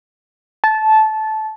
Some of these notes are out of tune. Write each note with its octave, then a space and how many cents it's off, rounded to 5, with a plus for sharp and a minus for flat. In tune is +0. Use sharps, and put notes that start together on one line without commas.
A5 -15